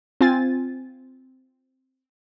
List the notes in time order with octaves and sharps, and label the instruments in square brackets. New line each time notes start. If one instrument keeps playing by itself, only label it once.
[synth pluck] C4 F4 G#5 A6